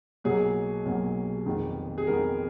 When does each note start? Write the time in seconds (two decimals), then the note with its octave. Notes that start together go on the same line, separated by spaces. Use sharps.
0.24 B1 B2 F#3 A#3 G#4
0.85 B1 B2 F#3 A#3
1.46 F1 F2 D#3 G#3 B3
1.98 G#4
2.07 F1 F2 D#3 G#3 B3 A#4